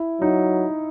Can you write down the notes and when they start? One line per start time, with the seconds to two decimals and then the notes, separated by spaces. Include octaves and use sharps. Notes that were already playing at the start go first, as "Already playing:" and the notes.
Already playing: E4
0.21 F#3 D#4